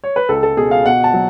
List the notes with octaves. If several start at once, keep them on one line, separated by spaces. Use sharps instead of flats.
C#5
B4
C#2 A4
A4
B2 G#4
F5
B2 F#5
A5
F#3